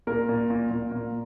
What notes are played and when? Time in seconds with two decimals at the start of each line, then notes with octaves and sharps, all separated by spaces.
0.07 A#2 A#4
0.29 A#2
0.50 A#2
0.71 A#2
0.91 A#2